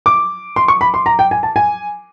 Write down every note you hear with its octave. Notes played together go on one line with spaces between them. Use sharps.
D6
C6
C#6
B5
C6
A#5
G5
G#5
A5
G#5